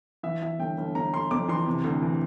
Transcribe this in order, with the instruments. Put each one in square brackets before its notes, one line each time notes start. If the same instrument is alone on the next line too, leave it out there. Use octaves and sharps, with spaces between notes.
[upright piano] E3 E5
E3 E5
G1 G5
G1
G1 A#5
G1 C6
F2 D6
E3 C6
C3
D2
E3